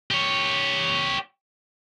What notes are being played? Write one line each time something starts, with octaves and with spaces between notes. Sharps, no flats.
G4 C#5